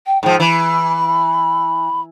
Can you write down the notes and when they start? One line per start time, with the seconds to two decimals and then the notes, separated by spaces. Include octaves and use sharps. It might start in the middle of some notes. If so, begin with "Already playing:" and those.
0.07 G5
0.23 G#2 F3 G5
0.40 E3 B5